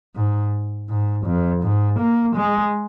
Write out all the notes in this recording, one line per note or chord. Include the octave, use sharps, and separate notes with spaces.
G#2
G#2
F2
G#2
A#3
G#3